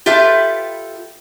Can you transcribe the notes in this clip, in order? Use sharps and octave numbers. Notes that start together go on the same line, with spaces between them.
F4 G4 A4 B4 E5